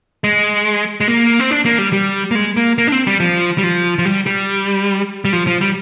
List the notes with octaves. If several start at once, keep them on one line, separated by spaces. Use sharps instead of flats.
G#3
G#3
A#3
C4
D4
A#3
G3
G3
A#3
G#3
A#3
A#3
D4
C4
G3
F3
G3
F3
F3
G3
G3
G3
F3
F3
G3